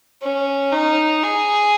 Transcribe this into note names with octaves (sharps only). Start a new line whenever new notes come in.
C#4
D#4
G#4